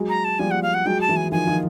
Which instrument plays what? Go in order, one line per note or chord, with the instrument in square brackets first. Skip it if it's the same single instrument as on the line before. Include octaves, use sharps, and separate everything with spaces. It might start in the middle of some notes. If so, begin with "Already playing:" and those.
Already playing: [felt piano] F#3 G#3
[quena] A#5
A5
[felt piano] F3 G3 [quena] G#5
[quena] F#5
F5
F#5
[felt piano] F#3 G#3 [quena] G5
[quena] A5
[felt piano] E3 F#3
[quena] G#5
[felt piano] D#3 F3 [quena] G#5
[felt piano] D#3 F3